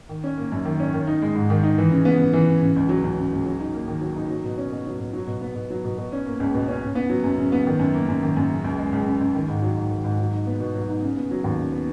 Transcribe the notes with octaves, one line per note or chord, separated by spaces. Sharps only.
D#3
C#4
A#3
F#2
D#3
C#4
D#3
D#4
G#3
G#2
D#3
D#4
E3
C#3
B3
C#3
E3
C#3
C#3
C#2
F#3
C#2
C#3
C#2
F#3
D#4
A#3
D#3
F#3
D#4
F#3
B2
C#4
B2
F#3
B2
F#3
B2
B3
B2
F#3
B2
B2
C#4
A#3
C#2
B2
C#4
C#3
B3
F#3
F#2
C#3
B3
D#3
F#2
A#3
F#2
D#3
F#2
C#3
C#2
G#3
C#2
C#3
C#2
D#3
G#2
F#3
G#2
D#3
G#2
F#3
D#4
B3
B2
F#3
D#4
C#3
B3
F#3
D#2
C#3
B3